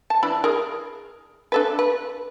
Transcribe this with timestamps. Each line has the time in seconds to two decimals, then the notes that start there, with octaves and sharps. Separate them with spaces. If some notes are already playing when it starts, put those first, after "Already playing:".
0.10 A5
0.23 E3 D4 B5
0.44 G#4 A#4
1.52 D4 A4 B4
1.79 B4